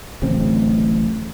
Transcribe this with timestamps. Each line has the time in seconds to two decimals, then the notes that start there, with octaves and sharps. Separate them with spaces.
0.22 D1 A1 C#3 C4